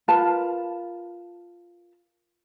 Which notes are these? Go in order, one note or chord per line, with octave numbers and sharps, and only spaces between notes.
F4 A#4 B4 A5